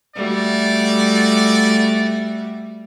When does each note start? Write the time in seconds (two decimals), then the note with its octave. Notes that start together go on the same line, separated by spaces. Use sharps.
0.15 G3 A3 F#4 D5